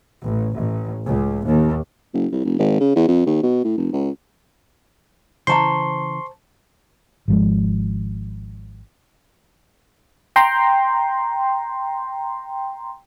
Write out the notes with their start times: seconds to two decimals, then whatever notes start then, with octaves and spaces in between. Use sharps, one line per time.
0.22 A1
0.54 A1
1.05 C#2
1.45 D#2
2.14 F#1
2.32 C2
2.45 F1
2.59 G#1
2.81 C#3
2.96 E2
3.08 F2
3.27 D#2
3.43 B2
3.64 A2
3.78 F1
3.93 C#2
5.47 C#3 E3 C5 A5 A#5 C6 C#6
7.28 G#1 F3 G#3
10.36 G5 A#5 C6